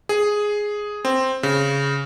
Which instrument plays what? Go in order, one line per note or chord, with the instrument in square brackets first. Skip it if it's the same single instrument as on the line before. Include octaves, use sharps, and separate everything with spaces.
[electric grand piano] G#4
C4
C#3